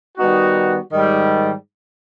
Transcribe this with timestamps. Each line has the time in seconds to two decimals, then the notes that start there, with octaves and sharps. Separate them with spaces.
0.17 D#3 G3 B3 D#4 F#4
0.91 G#2 D#3 G3